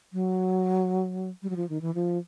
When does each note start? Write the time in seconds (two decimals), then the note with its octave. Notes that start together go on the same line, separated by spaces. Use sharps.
0.13 F#3
1.43 G3
1.50 F#3
1.56 F3
1.69 D#3
1.81 E3
1.95 F3